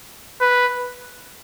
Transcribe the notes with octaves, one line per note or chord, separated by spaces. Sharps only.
B4